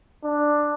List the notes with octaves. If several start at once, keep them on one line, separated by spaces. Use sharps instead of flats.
D4